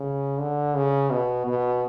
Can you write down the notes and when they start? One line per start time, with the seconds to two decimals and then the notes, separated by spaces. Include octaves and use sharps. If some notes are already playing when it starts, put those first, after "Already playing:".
Already playing: C#3
0.40 D3
0.75 C#3
1.11 B2
1.47 B2